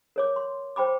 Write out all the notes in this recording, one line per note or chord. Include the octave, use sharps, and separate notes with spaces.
A#4 C#5 D6
C6
C5 G5 B5 D6